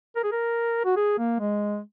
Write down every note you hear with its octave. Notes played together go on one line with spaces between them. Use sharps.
A#4
G#4
A#4
F#4
G#4
A#3
G#3